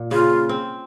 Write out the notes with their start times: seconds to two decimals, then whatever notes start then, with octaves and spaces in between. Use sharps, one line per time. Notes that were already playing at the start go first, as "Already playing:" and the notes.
Already playing: A#2
0.11 C#3 F4
0.49 C4